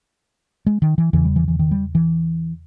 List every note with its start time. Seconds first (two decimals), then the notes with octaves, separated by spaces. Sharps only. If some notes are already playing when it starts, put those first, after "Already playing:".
0.66 G#3
0.82 D#3
0.98 E3
1.13 E2 C#3 E3
1.25 G3
1.36 E3
1.48 E3
1.59 D#3
1.71 G3
1.95 E3